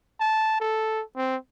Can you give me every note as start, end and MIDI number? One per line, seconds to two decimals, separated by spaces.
0.20 0.58 81
0.61 1.03 69
1.16 1.36 60